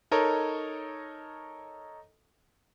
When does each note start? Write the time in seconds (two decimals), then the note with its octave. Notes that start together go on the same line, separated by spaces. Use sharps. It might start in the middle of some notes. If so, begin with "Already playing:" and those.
0.11 D#4 A4 A#4 C#5 D#5